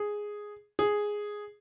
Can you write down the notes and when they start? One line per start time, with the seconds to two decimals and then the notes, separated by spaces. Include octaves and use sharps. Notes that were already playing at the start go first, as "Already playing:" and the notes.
Already playing: G#4
0.79 G#4